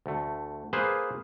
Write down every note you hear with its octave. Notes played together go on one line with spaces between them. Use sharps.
D2 A3
A#3 G#4 B4 C5